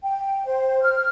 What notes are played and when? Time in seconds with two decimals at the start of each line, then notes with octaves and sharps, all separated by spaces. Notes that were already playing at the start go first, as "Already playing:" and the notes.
0.03 G5
0.46 C5
0.82 F6